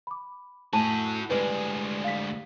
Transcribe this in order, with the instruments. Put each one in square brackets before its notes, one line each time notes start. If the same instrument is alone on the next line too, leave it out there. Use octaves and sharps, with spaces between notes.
[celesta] B5 D6
[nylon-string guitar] A2 [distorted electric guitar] F#4 G#5 [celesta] A5
[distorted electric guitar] D2 G#3 [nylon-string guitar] G3 D5 [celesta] B4
[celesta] F5 B6